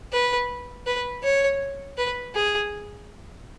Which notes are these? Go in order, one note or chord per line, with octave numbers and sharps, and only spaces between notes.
B4
B4
C#5
B4
G#4